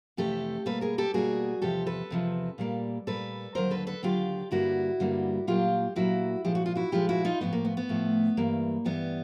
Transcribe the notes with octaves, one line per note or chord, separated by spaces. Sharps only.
F2 C3 E3 A3 G4 A4
B2 G3 A#3 A4 B4
G#4 A#4
G4 A4
B2 G3 A#3 F#4 G#4
E2 C3 F3 G4 A4
A4 B4
E2 C3 F3
A#2 G3 A#3
A#2 G3 A#3 A4 B4
D#2 D3 F#3 A#4 C5
A4 B4
A4 B4
D#2 D3 F#3 F4 G4
G2 D3 G3 A#3 E4 F#4
G2 D3 G3 A#3
A#2 F#3 A#3 F4 G4
A#2 F#3 A#3 E4 F#4
A#2 F3 G#3 G4
F#4
F4
E4 F#4
A#2 F3 G#3 F4 G4
E4 F#4
D#4 F4
A2 F3 A3 B3
A#3
B3
B3
A2 F3 A3
G2 E3 G3 A#3
G2 E3 G3 B3